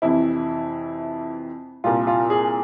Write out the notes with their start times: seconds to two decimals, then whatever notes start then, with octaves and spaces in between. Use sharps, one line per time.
0.02 F2 C3 E3 E4
1.84 C2 A#2 F4
2.07 F4
2.30 G#4